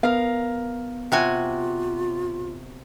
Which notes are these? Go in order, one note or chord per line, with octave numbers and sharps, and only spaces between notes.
B3 A#4 F5
C3 F4 F#4 G#5